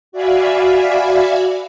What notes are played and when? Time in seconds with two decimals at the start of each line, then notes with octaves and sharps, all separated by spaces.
0.12 F#4 D5 E5 F5 G#5 B5